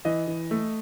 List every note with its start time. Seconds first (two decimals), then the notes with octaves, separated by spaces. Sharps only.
0.05 E3 D#5
0.27 E3
0.51 A3